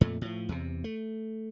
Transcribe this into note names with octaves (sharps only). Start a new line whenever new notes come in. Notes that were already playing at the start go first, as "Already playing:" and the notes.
F2 A#2 A3
A2 F3
E2 C3
A3